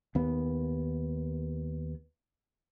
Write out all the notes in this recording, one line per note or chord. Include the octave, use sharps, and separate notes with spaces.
D#2 B3